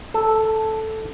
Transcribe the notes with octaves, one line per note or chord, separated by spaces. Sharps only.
A4